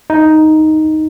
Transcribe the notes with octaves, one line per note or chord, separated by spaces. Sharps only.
D#4